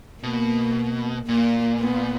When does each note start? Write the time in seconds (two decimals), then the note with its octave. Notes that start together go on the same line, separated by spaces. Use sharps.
0.23 B2 A#3
1.28 A#2 A#3
1.81 B3